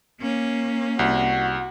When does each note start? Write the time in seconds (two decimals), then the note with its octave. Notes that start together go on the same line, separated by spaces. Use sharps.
0.20 A#3 C#4
0.99 C2 F#4